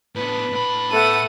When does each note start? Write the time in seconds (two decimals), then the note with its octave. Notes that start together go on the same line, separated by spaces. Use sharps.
0.15 A2 B3 D4 B4
0.52 A2 B5
0.91 A3 B3 A4 F#5 D#7